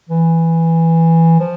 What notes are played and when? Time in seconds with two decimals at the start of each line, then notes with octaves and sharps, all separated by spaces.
0.09 E3
1.39 F3